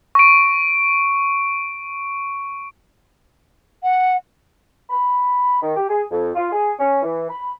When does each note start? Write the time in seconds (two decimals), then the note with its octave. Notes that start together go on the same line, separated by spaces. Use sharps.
0.15 C#6 D7
3.83 F#5
4.90 B5
5.62 D#3
5.77 G4
5.90 G#4
6.11 F2
6.35 F4
6.52 G#4
6.79 C#4
7.02 E3
7.30 B5